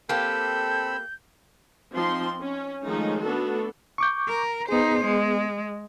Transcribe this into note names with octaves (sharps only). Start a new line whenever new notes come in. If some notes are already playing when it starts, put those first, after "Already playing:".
A#3 C4 G4 A4 B5 E6 G6
F3 C4 D#4 C6
C#4
D#3 F3 G#3 A3 C#4 D#4
A3 B3 D4 F#4 A4
C#6 D6 G6
A#4
B3 D#4 G#4 C5
G#3